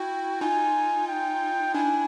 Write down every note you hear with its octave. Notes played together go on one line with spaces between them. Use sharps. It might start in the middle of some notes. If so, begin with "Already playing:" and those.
Already playing: E4 F#4 G5
D#4 F4 G#5
G5
D4 E4 G#5